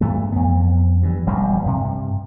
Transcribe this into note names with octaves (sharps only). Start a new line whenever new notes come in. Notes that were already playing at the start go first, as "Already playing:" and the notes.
G2 E3 A3
F2 B3
G2 E3
E1 A#1 G2 G3
G2 C3